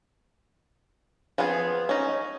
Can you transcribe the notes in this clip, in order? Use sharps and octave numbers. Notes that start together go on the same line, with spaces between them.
F3 B3 C4 G#4
C#4 D#4